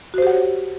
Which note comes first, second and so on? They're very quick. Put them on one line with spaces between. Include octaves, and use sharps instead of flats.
F#4 C5 G4 F#5 C#5